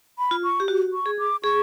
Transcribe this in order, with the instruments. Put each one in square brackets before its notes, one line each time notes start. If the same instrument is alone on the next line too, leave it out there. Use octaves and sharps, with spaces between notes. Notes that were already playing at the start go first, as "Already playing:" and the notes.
[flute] B5
[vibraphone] F4
[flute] C#6
[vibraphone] G4
F#4
[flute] C#6
[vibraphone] G#4
[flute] D6
[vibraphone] G#4 [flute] C#6